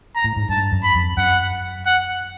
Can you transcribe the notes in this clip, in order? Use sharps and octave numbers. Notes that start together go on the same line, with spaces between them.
A#5
A2
G#2
G2 A5
F#2
B5
F2
F#2 F#5
F#5